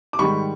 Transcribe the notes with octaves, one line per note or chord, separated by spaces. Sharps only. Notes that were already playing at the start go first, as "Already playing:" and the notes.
D6
G#2 D#3 G3 B5 C#6